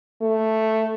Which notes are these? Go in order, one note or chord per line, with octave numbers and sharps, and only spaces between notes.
A3